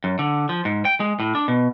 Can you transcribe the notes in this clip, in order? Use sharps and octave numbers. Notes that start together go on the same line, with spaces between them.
F#2
D3
F3
G#2
G5
G#3
A2
D4
B2